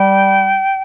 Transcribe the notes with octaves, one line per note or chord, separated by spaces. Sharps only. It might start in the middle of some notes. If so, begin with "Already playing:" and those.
Already playing: G3 G5